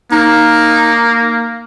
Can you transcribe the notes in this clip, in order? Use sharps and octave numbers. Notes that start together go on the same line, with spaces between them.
A#3 D#4